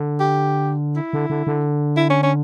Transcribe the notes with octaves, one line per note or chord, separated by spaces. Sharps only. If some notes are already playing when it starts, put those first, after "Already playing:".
Already playing: D3
G4
E4
D3
D3
D3
E4
C#4
C#4